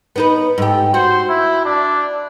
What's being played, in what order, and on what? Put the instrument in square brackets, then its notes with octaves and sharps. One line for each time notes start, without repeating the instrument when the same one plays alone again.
[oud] B3 D#4 B4
[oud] G#2 G4 [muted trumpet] A4
[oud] F#4 [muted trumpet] C5
[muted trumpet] E4
D4